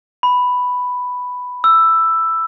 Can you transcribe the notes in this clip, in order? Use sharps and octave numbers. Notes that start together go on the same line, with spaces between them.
B5
E6